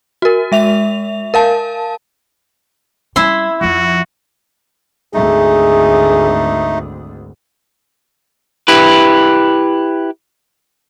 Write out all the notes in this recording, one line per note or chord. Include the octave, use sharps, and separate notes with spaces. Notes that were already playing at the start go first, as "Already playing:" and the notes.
F#4 A#4
G#3 E5 F7
A#4 F5 A5
G3 E4 E5 C6
F2 F3 F#4
G#1 D2 A3 D#4 G#4
E4 G4 B4